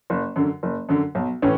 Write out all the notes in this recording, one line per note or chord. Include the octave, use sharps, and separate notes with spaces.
F#1
F#2 D3
F#1
F#2 D3
B1
A2 E3 C#4